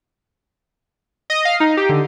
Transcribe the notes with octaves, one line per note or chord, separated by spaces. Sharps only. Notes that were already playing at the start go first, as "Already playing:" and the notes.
D#5
F5
D#4
G4
D3